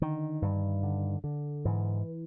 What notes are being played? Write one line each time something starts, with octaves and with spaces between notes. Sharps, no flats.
D3 D#3
G2
D3
D3
G#2 E3